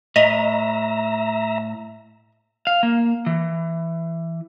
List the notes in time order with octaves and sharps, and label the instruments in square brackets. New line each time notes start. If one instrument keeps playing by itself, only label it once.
[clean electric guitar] A2 [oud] D#5 [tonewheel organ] E5 A#5
[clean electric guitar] F5
A#3
E3